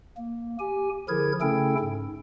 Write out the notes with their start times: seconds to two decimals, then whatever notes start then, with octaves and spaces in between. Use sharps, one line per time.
0.17 A#3
0.59 G4 G#5
1.08 D3 F3 E4 G#4 A#4 G#6
1.41 C#3 A3 C#4 E4 A4 G5
1.79 G#2